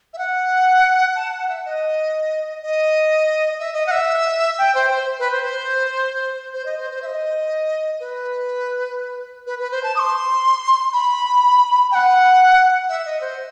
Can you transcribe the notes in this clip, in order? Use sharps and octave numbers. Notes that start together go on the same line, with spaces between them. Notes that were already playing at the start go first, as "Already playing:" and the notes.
E5
F#5
A5
F#5
E5
D#5
D#5
E5
D#5
F#5
E5
G5
C5
C5
B4
C5
C5
C5
D#5
C5
C5
E5
D#5
B4
B4
B4
C5
A5
D#6
C6
B5
G5
F#5
E5
D#5
C5